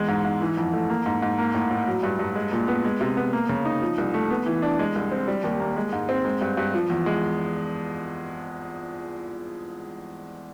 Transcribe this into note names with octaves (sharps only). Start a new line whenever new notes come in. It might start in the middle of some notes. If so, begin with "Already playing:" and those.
Already playing: E2 G#3
G#2
G#2
E3
F2
A3
A#3
G#2
G#2
A#3
A2
A2
F#3
G2
G2
G#3
A#2
B3
G#3
C3
B3
A#3
C#3
D#4
F3
C2
A3
B3
E3
D4
G#3
C2
C4
G3
D#2
A#3
G#3
G#2
C4
G#3
G2
G2
F3
E2
G#3